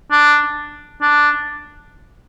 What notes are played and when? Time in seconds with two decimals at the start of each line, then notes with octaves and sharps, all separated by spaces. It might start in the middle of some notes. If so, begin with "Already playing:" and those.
0.11 D4
1.02 D4